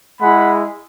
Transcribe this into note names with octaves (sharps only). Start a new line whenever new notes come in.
G#3 E4 F#5 B5